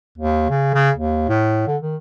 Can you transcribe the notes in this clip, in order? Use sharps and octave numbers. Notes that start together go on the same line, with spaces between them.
D#2
C#3
C#3
D#2
A2
D3
D#3